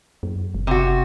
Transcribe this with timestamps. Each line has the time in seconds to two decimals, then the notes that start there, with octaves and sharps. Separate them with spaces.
0.23 F#2
0.55 F#1
0.67 C3 F#4